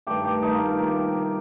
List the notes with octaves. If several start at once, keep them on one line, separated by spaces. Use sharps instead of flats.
G2 D#3 A3 G4
G4
G2 D#3 A3 D#4
F4
A#4
C3 D#3 A#3 A#4
C3 D#3 A#3